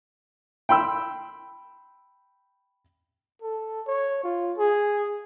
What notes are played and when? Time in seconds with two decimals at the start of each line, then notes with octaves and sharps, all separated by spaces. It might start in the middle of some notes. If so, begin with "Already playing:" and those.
0.69 G5 B5 C6 E6
3.42 A4
3.87 C#5
4.24 F4
4.58 G#4